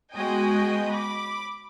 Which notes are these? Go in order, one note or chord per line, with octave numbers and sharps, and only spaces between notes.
G#3 B3 F#4 D#5 G5 G#5
B5 D6